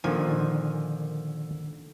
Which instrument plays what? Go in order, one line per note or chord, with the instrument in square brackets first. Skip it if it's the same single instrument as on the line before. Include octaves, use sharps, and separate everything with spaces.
[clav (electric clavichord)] A#2 F3 G#5 [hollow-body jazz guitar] D3 D#3